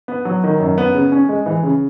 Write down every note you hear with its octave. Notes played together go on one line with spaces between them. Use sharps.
B3
F#3
D#3
F#2
B3
C#3
C#4
G#3
E3
C#3